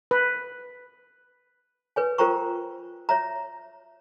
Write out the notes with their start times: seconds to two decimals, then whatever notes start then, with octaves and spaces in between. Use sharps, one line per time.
0.11 B4
1.96 B4 C#5 G#5
2.18 F4 A#4 C5 G5 A#5 C#6
3.09 C#5 E5 A#5